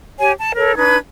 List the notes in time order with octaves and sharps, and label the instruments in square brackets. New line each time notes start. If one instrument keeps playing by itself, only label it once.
[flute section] G4 C#5 G#5
A5
A4 A#4 C#5
D4 D#4 B4 G#6